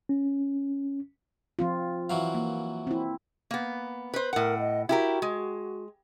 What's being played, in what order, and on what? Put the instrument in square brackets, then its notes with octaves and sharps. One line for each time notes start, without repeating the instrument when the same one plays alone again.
[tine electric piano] C#4
[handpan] F3 C4 F4
[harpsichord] E3 F#3 F5
[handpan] A#3
C4 E4
[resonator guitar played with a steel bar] A#3 B3
B4 C5
[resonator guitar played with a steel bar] A2 F#5 [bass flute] A#4
[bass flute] D#5
[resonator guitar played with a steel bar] E4 G4 A#4 [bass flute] F#4
[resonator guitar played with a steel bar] G#3